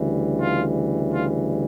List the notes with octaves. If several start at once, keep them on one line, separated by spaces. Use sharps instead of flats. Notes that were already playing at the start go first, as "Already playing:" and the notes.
Already playing: D2 C#3 E3 G3
F4
F4